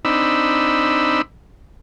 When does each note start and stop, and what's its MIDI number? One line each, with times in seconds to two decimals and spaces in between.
0.05 1.22 60
0.05 1.22 62
0.05 1.22 63
0.05 1.22 83
0.05 1.22 88